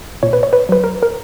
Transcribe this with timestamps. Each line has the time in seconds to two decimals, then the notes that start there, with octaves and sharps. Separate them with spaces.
0.23 A#2 C#5
0.33 B4
0.43 C#5
0.53 B4
0.69 F#3 B4
0.84 A#4
1.03 A#4